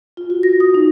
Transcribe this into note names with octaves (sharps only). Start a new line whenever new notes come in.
F4
F#4
A#6
D#6
D#4